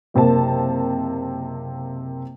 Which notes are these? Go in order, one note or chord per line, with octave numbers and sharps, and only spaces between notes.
F#1 C3 A#3 A5